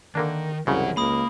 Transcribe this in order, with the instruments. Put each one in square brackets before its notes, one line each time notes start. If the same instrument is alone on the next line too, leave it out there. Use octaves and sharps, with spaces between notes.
[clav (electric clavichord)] D3 A#3 D4 [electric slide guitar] D#3
[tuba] C2 [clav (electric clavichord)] F#2 C#3 [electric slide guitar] E3 F#5
[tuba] C#2 [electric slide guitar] A#3 [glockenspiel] B5 D#6